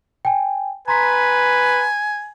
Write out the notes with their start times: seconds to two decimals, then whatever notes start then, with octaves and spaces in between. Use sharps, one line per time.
0.25 G5 G#5
0.88 B4 G#5 A#5 C6 B6